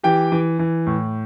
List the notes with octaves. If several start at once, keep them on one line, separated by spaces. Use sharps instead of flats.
E3 G4 G5
E3
E3
A2